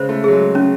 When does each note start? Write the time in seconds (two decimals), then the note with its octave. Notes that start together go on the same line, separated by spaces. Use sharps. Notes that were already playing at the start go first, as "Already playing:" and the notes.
Already playing: C#3 G#3 C5
0.09 A3
0.24 F#3 G#4
0.32 G#3
0.55 G#3 C#4